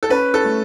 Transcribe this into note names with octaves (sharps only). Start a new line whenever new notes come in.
A4
C#4 B4
A4
A3